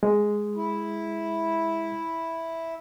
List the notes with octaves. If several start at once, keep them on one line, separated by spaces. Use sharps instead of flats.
G#3
E4